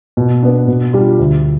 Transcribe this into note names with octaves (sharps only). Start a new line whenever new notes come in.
B2
B3 D4
B2
G3 D4 F4
D2